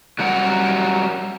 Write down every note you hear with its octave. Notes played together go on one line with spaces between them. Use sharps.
F#3 G3 A#4 F#5